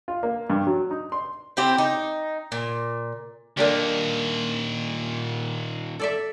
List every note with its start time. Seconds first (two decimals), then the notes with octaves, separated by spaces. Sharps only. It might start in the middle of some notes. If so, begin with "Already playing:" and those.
0.08 F4
0.23 A#3
0.50 G2
0.67 F#3
0.91 D#4
1.12 C6
1.57 C4 E4 G4 C5
1.78 D#4
2.52 A#2
3.57 A#2 D#3 A#3 D4 G4
6.00 A4 D5 E5